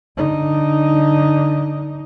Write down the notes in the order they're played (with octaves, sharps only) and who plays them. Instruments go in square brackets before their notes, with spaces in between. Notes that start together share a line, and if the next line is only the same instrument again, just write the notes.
[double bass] D3 D#4